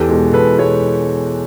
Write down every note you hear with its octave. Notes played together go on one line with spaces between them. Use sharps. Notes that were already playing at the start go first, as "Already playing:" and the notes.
Already playing: E2 G4 A4
B2 G#3
E2 A4 B4
B2 G#3 B4 C#5